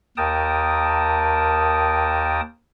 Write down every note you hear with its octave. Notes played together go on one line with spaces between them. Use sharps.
D#2 A#4 G5 A5 D#6